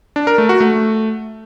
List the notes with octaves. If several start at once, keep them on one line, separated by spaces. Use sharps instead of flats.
D4
A#4
A3
F#4
A3